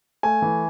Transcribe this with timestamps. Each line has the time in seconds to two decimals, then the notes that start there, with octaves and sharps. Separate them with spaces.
0.23 A3 G#5
0.42 E3